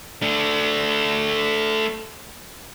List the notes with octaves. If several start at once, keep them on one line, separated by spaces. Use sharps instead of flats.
A3 D4